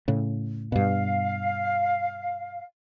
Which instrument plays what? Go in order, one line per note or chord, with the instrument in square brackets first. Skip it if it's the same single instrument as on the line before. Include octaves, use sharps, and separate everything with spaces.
[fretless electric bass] A2 C#3
[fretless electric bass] G2 B2 [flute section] F5